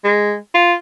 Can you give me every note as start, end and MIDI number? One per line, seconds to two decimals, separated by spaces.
0.04 0.35 56
0.54 0.73 65